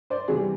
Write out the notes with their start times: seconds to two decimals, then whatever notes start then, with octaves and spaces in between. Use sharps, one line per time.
0.10 C5 D5
0.28 C3 E3 G3 F#4 G#4